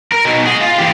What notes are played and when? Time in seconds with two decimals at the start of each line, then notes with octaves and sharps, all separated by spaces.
0.12 A#4
0.25 B2 D#4
0.46 G#4 D#5
0.61 F4
0.78 E3 G4